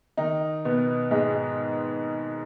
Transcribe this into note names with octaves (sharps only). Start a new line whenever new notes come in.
D#3 D#4
B2 B3
G#2 G#3